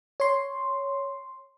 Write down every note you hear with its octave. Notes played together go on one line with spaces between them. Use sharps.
C#5 C6